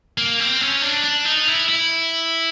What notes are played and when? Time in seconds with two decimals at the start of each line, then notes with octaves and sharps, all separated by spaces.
0.18 A#3
0.40 C4
0.61 C#4
0.82 D4
1.04 D4
1.25 D#4
1.47 E4
1.68 E4